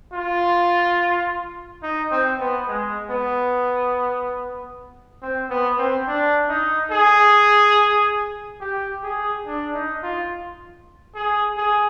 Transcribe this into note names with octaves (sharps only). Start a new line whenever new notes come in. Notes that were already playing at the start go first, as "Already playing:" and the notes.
F4
D#4
C4
B3
G#3
B3
C4
B3
C4
D4
D#4
G#4
G4
G#4
D4
D#4
F4
G#4
G#4